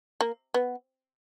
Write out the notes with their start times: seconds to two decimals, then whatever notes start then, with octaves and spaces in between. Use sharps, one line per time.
0.21 A#3
0.54 B3